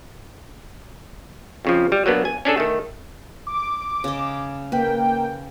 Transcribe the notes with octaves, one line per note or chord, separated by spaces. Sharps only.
F2 C#3 F3
G3
F#3 A#3 B3 D4
G#5
C#4 D4 G#4 A4
D#3 A3
D6
C#3 D#5
A#3 B4 G5